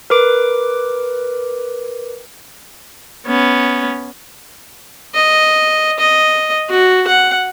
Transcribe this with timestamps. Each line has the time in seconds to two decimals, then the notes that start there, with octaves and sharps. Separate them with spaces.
0.10 A#4 B4 D6 D7
3.27 B3 C#4
5.15 D#5
5.99 D#5
6.70 F#4
7.07 F#5